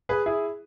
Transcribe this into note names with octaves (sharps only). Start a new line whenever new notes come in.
G#4 B4
E4 G#4